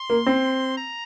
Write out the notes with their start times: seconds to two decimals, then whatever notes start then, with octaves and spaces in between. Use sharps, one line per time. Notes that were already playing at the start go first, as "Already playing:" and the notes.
Already playing: C6
0.10 A#3
0.26 C4
0.78 A#5